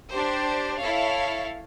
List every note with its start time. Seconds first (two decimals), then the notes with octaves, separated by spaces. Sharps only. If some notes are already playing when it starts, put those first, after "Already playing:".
0.11 D4 G4 C5
0.77 E4 A4 C#5 F5